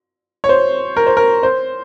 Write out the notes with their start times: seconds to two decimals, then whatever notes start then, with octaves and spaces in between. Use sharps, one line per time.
0.44 C#5
0.49 C5
0.97 A#4
1.07 C5
1.17 A#4
1.43 C5